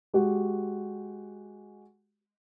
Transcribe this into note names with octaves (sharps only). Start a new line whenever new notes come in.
G#3 F#4 G4 F#5